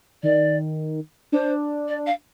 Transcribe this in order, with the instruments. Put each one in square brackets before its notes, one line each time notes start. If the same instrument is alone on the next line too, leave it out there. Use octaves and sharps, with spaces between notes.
[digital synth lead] D#3 [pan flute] D5
[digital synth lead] D4 [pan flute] C5
[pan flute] D5
F5